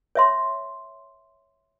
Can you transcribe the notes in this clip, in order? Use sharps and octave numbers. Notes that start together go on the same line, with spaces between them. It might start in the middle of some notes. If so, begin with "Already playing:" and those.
C#5 E5 C6